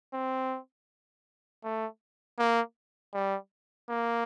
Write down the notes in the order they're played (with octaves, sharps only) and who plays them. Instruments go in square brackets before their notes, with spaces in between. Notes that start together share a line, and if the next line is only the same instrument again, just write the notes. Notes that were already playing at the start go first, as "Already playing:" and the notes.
[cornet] C4
A3
A#3
G3
A#3